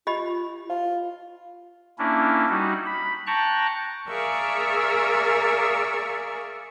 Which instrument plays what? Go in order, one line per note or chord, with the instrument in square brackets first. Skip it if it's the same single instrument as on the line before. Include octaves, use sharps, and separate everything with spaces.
[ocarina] F4 [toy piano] G4 D#5 B5
[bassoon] F4
[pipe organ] A#3 C#4 D4 E4
G3 D#4 F#4
B5
G5 A5 A#5 C#6 F#6
[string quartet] G#4 A#4 D5 E5 F5 C#6